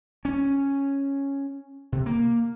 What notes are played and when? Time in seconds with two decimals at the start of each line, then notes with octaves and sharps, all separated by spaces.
0.25 C#4
1.92 C3
2.06 A#3